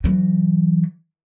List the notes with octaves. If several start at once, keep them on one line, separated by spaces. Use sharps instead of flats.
E3 F#3